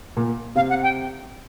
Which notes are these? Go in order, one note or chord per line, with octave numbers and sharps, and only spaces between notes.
A#2
C3 F5
F#5
G5